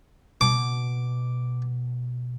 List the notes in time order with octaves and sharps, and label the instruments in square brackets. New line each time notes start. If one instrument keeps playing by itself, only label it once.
[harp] B2 [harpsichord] D6